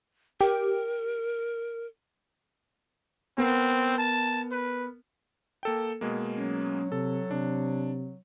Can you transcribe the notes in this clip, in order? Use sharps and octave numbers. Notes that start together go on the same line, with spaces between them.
G4 A#4
B3 C4 A#4
A5
B4
A#3 A4 G5
B2 G#3 A#3
F#3 C#4
C3 A4
C3 D4